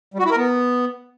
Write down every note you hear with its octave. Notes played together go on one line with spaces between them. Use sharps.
G3
F#4
E4
A#4
B3